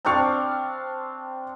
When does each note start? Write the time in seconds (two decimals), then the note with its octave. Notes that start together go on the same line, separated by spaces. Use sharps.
0.05 C4 D4 F5 A5 C#6 D6